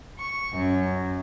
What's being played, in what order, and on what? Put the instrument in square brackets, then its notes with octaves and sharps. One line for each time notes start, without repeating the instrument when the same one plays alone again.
[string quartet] C#6
F#2